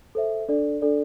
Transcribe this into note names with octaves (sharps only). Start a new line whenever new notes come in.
A4 C5 E5
D4 A4 D5
D4 A4 D5